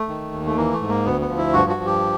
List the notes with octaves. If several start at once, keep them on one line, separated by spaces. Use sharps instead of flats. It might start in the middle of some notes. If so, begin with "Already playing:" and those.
Already playing: A3
D#3
D#2
A3
E3 A#3
A3
G#2
A#3
D2 B3
B3
F3
E4
G2 F#4
F#4
F3
G4